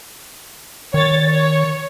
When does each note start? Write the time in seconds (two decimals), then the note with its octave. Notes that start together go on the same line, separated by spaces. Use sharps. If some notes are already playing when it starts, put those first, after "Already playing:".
0.94 D#3 C#5 A6
1.29 C#5